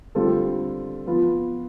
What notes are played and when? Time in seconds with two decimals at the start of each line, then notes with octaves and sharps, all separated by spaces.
0.15 D3 G3 C4 F4 A4
1.06 F3 B3 F4 B4